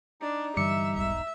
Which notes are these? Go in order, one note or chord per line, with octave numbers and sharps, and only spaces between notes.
D4 D#4
G2 D3 E3 G3 E5 D6 C#7
E1 B1 G#2 E5